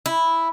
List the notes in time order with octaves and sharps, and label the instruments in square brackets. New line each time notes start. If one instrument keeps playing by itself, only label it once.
[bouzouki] E4